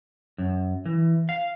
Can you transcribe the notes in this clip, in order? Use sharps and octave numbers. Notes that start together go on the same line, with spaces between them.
F#2
E3
F5